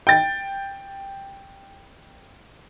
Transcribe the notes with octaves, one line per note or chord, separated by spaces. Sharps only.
G5 A6